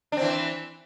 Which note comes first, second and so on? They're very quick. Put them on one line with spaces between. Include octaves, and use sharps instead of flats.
D4 C4 E3